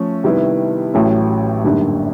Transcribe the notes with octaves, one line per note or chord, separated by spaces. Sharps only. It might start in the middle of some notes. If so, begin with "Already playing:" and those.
Already playing: F3 A3 C#4
C3 D#3 G3 B3 E4
A1 A2 F#3 A3 C#4
G#1 F#2 D3 G3 A#3